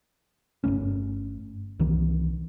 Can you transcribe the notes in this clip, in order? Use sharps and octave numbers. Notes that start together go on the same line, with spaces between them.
G1 G2 A3 C#4
C2 D#3 E3